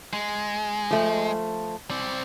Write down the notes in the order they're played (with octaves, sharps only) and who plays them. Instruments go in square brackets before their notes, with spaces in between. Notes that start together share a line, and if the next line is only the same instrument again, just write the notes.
[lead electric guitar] G#3
[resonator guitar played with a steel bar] F3 A3
[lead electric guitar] C4 D5